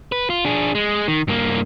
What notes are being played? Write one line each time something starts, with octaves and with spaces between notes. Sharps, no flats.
B4
F4
D4 G#4
G#3
D#3
G2 A#3